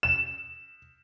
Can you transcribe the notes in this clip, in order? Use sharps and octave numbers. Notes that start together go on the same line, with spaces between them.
E7